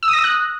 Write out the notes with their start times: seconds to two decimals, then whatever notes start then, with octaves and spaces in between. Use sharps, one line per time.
0.03 E6
0.08 D#6
0.13 A#6
0.19 D#6
0.24 F#6